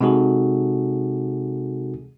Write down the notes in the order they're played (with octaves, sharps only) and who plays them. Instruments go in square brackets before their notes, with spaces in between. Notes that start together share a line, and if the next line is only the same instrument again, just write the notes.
[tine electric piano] C3 G#3 D#4 F#4 G#4 A4